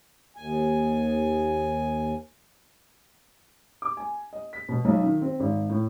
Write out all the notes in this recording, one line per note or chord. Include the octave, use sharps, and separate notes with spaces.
D#2 G#5
D6
G#5
D#5
B6
B2
B1
D#3
C4
G#1
A2